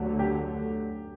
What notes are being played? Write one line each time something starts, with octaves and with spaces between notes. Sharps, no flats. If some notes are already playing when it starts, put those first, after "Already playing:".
Already playing: D2 D3 F#3 A3 G4
G4